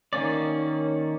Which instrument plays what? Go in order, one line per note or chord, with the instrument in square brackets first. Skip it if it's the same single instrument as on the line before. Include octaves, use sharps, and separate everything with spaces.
[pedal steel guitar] D#3 A#3 C#4 D5